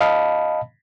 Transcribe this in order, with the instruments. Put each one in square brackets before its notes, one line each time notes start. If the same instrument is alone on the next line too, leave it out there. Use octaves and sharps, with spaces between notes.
[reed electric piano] D#5 F5 A5 B5